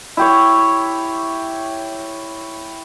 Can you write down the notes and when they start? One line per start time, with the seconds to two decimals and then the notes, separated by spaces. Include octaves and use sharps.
0.17 E4 G4 C#5